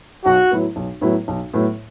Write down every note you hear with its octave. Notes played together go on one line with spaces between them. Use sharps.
B1 F#4
A2 F#3 B3 E4
B1
A2 F#3 B3 E4
B1
A2 F#3 B3 E4